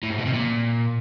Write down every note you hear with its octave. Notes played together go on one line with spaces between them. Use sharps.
A2
G#2
B2
C3
A#2